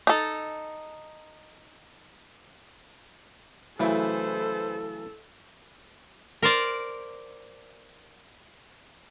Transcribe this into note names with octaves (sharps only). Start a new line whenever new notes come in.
D#4 A4
C#3 E3 F#3 A3 E4 A4 B4 C5
A#4 C5 D5